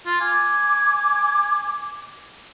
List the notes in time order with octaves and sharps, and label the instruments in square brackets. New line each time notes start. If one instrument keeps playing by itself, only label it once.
[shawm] F4
[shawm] G#5 [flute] D6